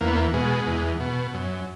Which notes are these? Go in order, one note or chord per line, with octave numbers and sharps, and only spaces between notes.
E2 A#3
B3
A#3
B2 G#3
E2
B2
F#2